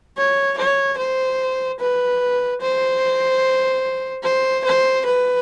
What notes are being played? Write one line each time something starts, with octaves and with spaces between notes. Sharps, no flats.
C#5
C#5
C5
B4
C5
C5
C5
B4